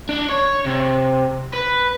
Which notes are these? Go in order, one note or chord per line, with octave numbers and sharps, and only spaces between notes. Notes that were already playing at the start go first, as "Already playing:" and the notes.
D4
C#5
C3
B4